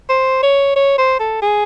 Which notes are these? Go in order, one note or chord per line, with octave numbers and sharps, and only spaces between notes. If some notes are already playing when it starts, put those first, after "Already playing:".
C5
C#5
C#5
C5
A4
G#4